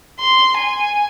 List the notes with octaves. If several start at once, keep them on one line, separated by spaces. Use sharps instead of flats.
C6
G#5